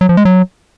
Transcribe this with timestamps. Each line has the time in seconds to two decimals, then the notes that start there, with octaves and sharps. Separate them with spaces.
0.01 F#3
0.09 F3
0.17 G#3
0.25 F#3